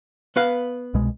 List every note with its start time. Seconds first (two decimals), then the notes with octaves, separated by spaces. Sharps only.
0.36 B3 B4 F5
0.94 C2 B2 G#3